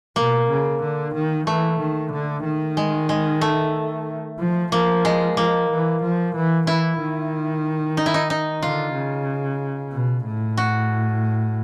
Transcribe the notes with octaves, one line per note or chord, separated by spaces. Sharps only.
B2 A#3
C#3
D3
D#3
E3 A3
D#3
D3
D#3
G#3
G#3
A3
F3
F3 A#3
G#3
F3 A#3
E3
F3
E3
E3 E4
D#3
D#4
E4
D#4
D#4
D3 F4
C#3
B2
A2
F#4